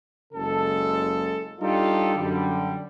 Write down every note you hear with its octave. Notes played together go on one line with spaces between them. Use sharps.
F#1 C#3 G#3 A4
G3 D4 D#4 F4 G4 A4
F#2 D3 G3